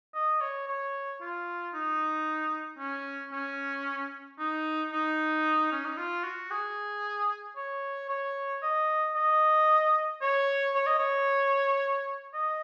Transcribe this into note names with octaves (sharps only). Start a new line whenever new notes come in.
D#5
C#5
C#5
F4
D#4
C#4
C#4
D#4
D#4
C#4
D#4
F4
F#4
G#4
C#5
C#5
D#5
D#5
C#5
C#5
D#5
C#5
D#5